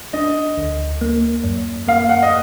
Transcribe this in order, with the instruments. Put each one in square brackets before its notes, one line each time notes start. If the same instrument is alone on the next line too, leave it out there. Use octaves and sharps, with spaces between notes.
[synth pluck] D4 [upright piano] D#5
[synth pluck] D2
A#3
F#2
[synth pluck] A#3 [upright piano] F5
[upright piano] F#5
D#5